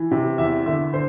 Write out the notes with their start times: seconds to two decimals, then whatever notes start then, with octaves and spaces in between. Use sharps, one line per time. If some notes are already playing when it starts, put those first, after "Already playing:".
Already playing: E3
0.11 C3
0.38 E2 E5
0.66 D3 E5
0.93 D3 C5